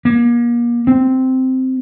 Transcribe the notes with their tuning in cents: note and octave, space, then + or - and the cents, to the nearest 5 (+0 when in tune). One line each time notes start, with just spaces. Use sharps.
A#3 +35
C4 -10